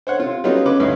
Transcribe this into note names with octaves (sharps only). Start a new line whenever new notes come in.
C5 C#5 F#5
C3 F4
F#3 G3 B3 C#4 D#4 F4
C#3 C#4 B4 D6
D2 G2 C#4 D#4 E4